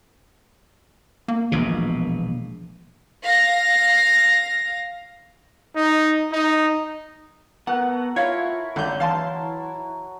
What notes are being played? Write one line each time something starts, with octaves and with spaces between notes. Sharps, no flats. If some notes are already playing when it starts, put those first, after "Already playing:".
A#3
E1 A#1 B2
F5 A#6
D#4
D#4
B3 F#4 A4 A#4 F#5
E4 F4 C#5 F5
G#1 D3 F#3 F5 G6
E3 F5 A5 C6